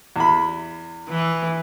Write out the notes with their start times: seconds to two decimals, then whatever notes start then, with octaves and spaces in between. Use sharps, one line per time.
0.16 E2 B5
1.08 E3